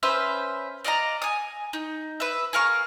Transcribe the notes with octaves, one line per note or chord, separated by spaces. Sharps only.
C#4 B4 C5 E5
D5 D#5 F5 A#5
G#5 D#6
D#4
B4 E5
G#4 A#4 F5 C#6